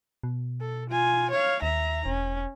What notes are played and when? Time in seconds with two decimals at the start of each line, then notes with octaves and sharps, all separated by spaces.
0.23 B2
0.60 A4
0.90 F4 G#5
1.31 C#5 F5
1.62 D#2 E5 A#5
2.06 E1 C#4